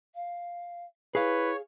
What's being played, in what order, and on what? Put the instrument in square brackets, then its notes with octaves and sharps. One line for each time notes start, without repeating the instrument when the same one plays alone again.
[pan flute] F5
[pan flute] E4 [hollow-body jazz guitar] G#4 F5 [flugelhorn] B4 [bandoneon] C#5